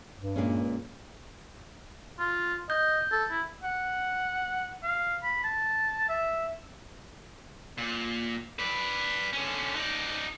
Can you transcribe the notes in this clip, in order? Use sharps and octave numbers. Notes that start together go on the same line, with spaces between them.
G2
A#2 G#3 C#4
F4
D#5 G6
A4
E4
F#5
F5
B5
A5
E5
A#2
B4 D5
D3 C#4
D#4 D5